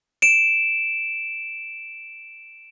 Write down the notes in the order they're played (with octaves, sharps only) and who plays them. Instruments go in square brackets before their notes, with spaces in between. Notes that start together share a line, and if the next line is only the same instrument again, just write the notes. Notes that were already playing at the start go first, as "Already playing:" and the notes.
[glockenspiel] D7 E7